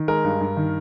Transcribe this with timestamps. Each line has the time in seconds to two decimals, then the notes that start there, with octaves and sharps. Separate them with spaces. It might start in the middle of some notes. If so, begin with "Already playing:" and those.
Already playing: D#3
0.08 G#3 A#4
0.24 G2
0.41 G2
0.57 D#3